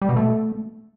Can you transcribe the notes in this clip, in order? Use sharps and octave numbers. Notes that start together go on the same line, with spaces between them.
G3
B2
A3